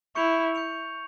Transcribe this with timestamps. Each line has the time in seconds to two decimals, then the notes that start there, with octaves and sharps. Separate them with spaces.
0.15 E4 C#6 G6 C#7 F7
0.55 G6 C#7 F7